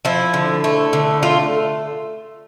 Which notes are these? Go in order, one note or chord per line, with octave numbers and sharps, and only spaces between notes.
F3 E4
D3
A3
D3
A3 F4